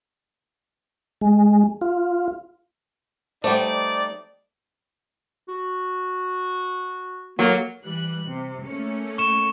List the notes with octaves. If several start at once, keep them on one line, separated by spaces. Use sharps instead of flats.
G#3
F4
G3 A3 D#4 C5 D5 G5
F#4
F#3 A#3 A4
E3 G3 F#6
C3
A3 A#3 C#4
C#6 E7